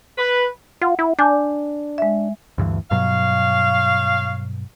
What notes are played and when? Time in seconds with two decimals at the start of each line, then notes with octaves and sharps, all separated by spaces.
0.18 B4
0.81 F4 F#5
0.99 E4
1.19 D4 G#5 D6 G6
1.98 G#3 E5
2.58 D2 G2 E3
2.91 G2 B2 F#3 C#5 F5